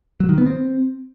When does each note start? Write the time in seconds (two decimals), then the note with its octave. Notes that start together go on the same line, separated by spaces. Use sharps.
0.20 F#3
0.29 D#3
0.38 B3
0.47 C4